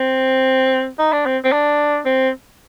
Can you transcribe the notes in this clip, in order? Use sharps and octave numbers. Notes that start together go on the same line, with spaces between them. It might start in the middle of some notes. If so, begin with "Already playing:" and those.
Already playing: C4
D#4
D4
C4
C4
D4
C4